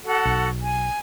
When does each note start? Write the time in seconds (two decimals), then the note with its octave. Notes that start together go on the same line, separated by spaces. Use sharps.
0.03 F#4 A4 F#5
0.25 B1
0.61 G#5